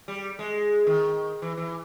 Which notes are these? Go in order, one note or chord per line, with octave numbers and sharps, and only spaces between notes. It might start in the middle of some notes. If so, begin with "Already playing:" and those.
G3
G#3
D#3
E3
E3